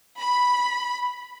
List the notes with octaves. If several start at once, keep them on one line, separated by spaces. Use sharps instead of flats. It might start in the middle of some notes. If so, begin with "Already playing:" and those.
B5